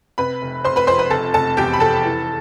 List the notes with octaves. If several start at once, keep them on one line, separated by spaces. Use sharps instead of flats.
C3 B4 B5
F1
F1 C5 C6
B4 B5
F2 C5 C6
B4 B5
F1 A4 A5
F1 A4 A5
E2 G4 G5
B5
F1 A4 A5
E3